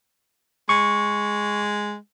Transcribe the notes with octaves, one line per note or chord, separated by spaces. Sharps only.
G#3 C#6